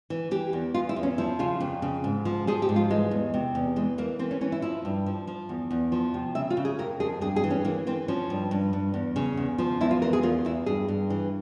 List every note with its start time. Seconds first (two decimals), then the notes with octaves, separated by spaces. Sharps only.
0.10 E3
0.31 E3 G4
0.53 E2
0.74 E2 F4
0.89 E4
0.96 E2
1.03 C#4
1.18 F3 E4
1.39 C#3 F4
1.60 F2
1.82 C#3
2.04 G#2
2.25 F3
2.47 F3 G#4
2.62 G4
2.69 G#2
2.76 F4
2.90 E3 G#3
3.11 E2
3.34 C3
3.55 E2
3.76 E3 G#3
3.98 E3 A#3
4.19 E3 C4
4.31 C#4
4.41 E3 C#4
4.52 E4
4.62 F3 E4
4.85 G2
5.06 F3
5.27 F3
5.49 E2
5.71 E2
5.92 F3
6.14 C3
6.35 C#3 E5
6.50 F4
6.57 C#3
6.65 G#4
6.79 F2 A#4
7.00 F2 G#4
7.21 G2 G#4
7.36 G#4
7.44 E3
7.51 C#4
7.65 E3 A#3
7.87 E3 C4
8.08 F3 C#4
8.30 G2
8.51 G2
8.73 G2
8.94 E2
9.16 C#3
9.37 E2
9.58 F3
9.81 E2 E4
9.91 F4
10.02 E3 A#4
10.13 G#4
10.23 E2 F4
10.45 E2 E4
10.66 G2 G#4
10.88 G2
11.10 E3